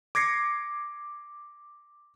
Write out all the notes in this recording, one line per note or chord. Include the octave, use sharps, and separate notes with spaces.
D6 G#6 A#6 C7 C#7